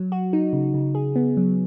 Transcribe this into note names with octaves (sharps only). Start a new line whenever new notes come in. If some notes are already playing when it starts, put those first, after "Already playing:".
Already playing: F#3
F#4
D#4
C#3
C#3
G#4
B3
F#3